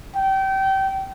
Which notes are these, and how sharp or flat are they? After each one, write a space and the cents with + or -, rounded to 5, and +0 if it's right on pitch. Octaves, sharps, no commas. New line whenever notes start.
G5 -25